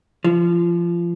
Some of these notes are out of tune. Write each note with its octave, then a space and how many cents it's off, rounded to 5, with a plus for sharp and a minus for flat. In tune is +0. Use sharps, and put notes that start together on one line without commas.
F3 -25